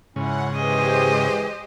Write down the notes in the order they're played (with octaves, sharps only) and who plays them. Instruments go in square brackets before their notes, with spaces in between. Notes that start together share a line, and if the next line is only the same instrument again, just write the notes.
[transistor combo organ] G#2 C#3 [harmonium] C#4 E4 [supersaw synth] F#5
[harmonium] E3 G#4 [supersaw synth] G#3 G4 C5 [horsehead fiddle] D#5